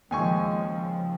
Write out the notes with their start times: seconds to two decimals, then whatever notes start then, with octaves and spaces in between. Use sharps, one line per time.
0.11 D#2 C#3 F3 G#3 G5 G#5 C#6